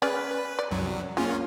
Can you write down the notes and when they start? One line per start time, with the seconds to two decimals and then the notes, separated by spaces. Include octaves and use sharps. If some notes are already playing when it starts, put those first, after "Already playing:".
0.02 C#4 G#4 B4 D5
0.59 D5
0.71 C2 F#2 F#3
1.17 G#3 A#3 C#4 F4